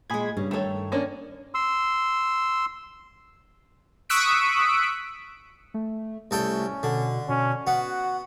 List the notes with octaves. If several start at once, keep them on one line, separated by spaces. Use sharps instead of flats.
A#2 G#3 G#4 B5 G#6
G2 C#3
D#3 A3 A4 C#5
A#3 C#4 D4
C6 E6
C#6 D#6 E6 F#6 B6 D7
A3
C2 A3 C#4 A4 G5
B2 D3
B2 C#4
B3 F#4 F#5